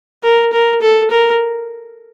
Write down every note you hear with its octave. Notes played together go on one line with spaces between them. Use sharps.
A#4
A#4
A4
A#4